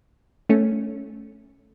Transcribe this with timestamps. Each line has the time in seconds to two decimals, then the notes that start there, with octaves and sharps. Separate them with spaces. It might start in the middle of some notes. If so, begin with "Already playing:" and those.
0.49 A3 C#4